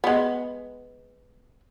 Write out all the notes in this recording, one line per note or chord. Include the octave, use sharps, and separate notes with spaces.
G#3 B3